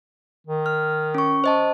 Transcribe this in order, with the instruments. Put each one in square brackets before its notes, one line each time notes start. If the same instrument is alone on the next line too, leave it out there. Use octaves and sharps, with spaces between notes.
[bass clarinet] D#3
[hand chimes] F6
C#4 C#6
C5 D#5 A5